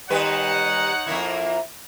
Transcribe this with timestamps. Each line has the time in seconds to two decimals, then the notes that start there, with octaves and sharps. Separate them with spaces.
0.10 D#3 G3 D#4 B4 C#5 F#5
1.07 F2 A#3 E4